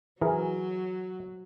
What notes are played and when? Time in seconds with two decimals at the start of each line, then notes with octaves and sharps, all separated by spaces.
0.21 E3 F#3 G#4 A#4